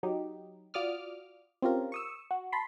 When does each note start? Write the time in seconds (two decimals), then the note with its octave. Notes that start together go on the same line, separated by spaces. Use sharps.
0.03 F#3 D#4 G4
0.74 F4 F#4 D5 D6 D#6 F6
1.62 C4 C#4 F4 G4 A#4
1.92 C#6 D#6 E6
2.31 F#4
2.52 A5 B5 C6